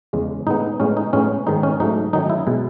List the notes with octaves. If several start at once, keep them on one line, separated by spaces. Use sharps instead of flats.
E2 C#3 G#3
A2 G#3 B3 D#4
A2 G#3 B3 C#4
D#4
A2 G#3 B3 C#4
G#2 D#3 G#3 B3 D#4
C#4
G#2 F#3 A3 D#4
F#2 D#3 F#3 A3 D#4
E4
B2 G#3 B3